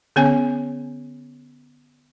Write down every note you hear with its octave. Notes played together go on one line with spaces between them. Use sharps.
D3 B3 C#4 C#5 G#5 A5